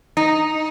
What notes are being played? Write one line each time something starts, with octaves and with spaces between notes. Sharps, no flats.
D#4